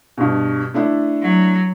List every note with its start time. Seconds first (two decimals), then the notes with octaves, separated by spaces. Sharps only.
0.17 G2 B2
0.74 A3 D4 E4
1.21 F#3